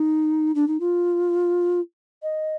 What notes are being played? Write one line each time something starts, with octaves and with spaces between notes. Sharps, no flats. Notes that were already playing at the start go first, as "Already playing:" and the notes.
Already playing: D#4
D4
D#4
F4
D#5